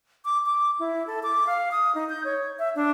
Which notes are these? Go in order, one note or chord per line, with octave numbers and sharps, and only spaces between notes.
D6
D6
E4
A4
D6
F5
D#6
D#4
G6
C#5
E5
D4